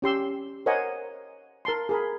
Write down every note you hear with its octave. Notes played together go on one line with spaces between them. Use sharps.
C#4 G4 C6 E6
A#4 C5 C#5 D#5 F#5 G#5
A#4 A5 C6
G#4 A#4 B5